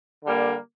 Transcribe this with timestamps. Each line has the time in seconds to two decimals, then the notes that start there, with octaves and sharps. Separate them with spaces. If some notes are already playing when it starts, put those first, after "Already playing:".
0.24 D3 G3 A#3